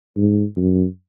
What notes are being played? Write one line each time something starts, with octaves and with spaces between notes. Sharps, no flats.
G#2
F#2